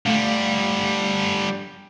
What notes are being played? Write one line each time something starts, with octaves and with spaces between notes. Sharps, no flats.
D3 G3 A3 F5